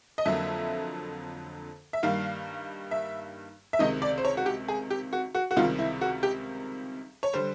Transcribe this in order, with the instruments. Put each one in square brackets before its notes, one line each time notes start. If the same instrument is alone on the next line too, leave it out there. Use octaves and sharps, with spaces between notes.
[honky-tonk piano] D#5
F2 D3 F#3 A#3 E5
E5
G2 D#3 G3 A#3 F5
E5
E5
C#2 C3 D#3 D#5
D5
C5
C#5
F#4
G4
G#4
G4
F#4
F#4
F#4
C#2 C3 D#3 G3 F4
E4
F#4
G4
C#5
D3 G3 C5